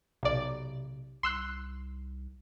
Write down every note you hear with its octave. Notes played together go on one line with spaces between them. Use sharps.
B1 C3 D5
C2 C6 E6 F#6